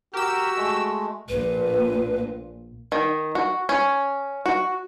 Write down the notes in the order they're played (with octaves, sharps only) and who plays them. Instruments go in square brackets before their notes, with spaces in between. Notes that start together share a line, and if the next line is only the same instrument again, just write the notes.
[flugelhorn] F#4 [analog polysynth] G4 E6 [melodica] A#4
[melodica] G#3 A3
[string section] A#1 A#2 [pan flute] B4
[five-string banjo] D#3
F#4
C#4
F#4